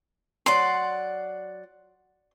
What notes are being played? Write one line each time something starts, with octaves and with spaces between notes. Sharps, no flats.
F#3 D5 F#5 C6